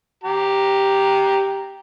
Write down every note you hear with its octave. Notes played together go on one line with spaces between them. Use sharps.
G4 A#5